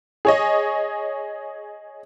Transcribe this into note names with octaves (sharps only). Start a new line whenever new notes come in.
G#4 C#5 D#5